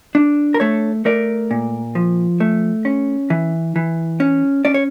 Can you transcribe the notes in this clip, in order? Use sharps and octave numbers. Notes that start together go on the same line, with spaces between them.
D4
A#4
A3 A4 C#5
A3 A#4 D5
A#2
F3
A3
C#4
E3
E3
C#4
C#4 D5
C#5